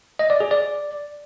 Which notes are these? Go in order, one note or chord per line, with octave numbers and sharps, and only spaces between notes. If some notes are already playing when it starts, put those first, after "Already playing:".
D#5
D5
G#4
D5